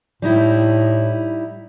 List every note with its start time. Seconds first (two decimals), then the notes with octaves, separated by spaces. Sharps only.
0.22 A2 G3 D#4 E4